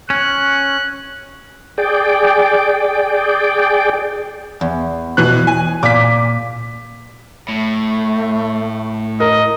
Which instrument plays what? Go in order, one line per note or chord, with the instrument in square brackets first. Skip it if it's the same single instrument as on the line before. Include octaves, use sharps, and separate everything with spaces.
[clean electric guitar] C#4 [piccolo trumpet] F#6
[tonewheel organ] G#4 D5 G5
[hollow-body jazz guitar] E2
[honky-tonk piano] B2 E3 F#6
G#5
[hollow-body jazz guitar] A#2 [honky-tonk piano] D6 B6
[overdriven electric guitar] A2 [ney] A3
[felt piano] A#4 [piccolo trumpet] D#5